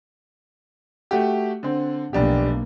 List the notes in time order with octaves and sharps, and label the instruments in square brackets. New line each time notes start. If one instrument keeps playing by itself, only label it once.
[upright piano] A3 F#4 G4
D3 C4
[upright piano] F1 D4 G4 [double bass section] B1 A#3